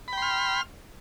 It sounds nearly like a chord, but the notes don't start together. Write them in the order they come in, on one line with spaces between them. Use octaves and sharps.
B5 G5 C6 F6